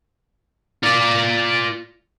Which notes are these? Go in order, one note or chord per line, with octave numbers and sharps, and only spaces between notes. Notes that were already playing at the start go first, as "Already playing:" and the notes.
F4 D5